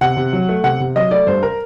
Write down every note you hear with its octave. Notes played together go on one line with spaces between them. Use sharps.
C3 F#5
C3
F#3
A3
C3 F#5
C3
F#3 D#5
A3 D5
G2 C5
A#4